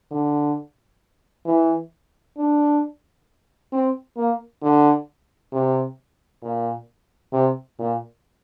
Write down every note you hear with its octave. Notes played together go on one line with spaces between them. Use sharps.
D3
E3
D4
C4
A#3
D3
C3
A#2
C3
A#2